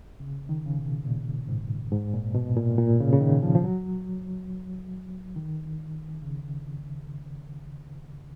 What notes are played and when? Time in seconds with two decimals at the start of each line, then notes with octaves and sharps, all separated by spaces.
0.20 C#3
0.49 D#3
0.66 C#3
0.77 B2
1.05 A#2
1.48 G#2
1.91 G#2
2.13 A#2
2.35 B2
2.56 A#2
2.78 A#2
3.00 C#3
3.13 C#3
3.21 D#3
3.43 F3
3.55 F3
3.64 F#3
5.36 D#3
6.22 C#3